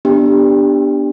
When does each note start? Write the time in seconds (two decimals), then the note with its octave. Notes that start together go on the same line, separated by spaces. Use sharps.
0.05 B3 D4 G4